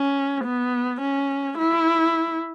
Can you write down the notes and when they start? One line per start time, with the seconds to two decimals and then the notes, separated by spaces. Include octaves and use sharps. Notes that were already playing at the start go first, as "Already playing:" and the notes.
Already playing: C#4
0.44 B3
1.01 C#4
1.58 E4